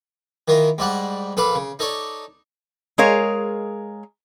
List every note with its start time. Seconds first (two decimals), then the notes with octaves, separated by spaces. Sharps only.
0.48 D#3 E3 F4 A#4
0.78 G#2 G3 D5 F#5
1.37 A#1 A4 B4 F5 B5 D6
1.55 C#3
1.79 D#4 A4 C#5 D5
2.98 G#3 G#4 A#4 C#5 F5